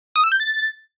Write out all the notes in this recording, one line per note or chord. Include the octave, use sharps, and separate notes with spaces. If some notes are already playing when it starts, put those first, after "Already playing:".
D#6
E6
G6
A6